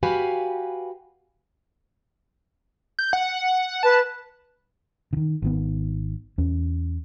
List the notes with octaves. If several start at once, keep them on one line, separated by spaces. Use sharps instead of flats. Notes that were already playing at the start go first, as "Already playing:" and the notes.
F#4 G4 B4 F5 G#5
G6
F#5
B4 A5
D3 D#3
G#1 D#3 B3
E2 C#4